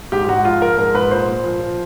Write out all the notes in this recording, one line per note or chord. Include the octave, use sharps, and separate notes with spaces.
G#2 G4
G4
G#2 F#4
F3 F4
F3 A#4
G#2 A#4
G#2 B4
A#2 C5
A#2
F3
F3